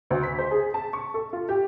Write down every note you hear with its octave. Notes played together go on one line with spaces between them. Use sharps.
D2
B6
C5
G#4
A5
C#6
A4
F4
G4